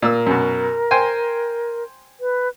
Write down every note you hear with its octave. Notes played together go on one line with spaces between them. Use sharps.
A#2 A#4 E6
F#2 B2
C5 G5 G#5
B4